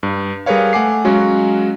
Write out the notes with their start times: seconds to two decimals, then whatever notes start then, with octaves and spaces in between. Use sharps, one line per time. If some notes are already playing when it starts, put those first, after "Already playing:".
0.03 G2
0.46 G3 G#4 A#4 B4 C#5 F5
0.73 A3 F#5 G#5 D6 C7
1.05 F#3 G#3 C#4 F#4 F5